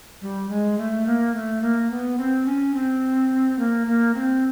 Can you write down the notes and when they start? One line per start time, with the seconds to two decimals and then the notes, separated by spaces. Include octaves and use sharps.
0.22 G3
0.49 G#3
0.78 A3
1.06 A#3
1.34 A3
1.62 A#3
1.91 B3
2.17 C4
2.46 C#4
2.74 C4
3.59 A#3
3.87 A#3
4.14 C4